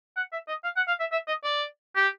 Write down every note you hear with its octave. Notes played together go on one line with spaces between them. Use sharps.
F#5
E5
D#5
F5
F#5
F5
E5
E5
D#5
D5
G4